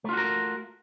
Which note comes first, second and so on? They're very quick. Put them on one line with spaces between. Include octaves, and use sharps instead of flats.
A3 F4 F#4 A#4